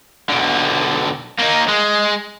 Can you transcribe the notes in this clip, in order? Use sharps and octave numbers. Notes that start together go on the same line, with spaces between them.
B1 D3
A#3 D#4
G#3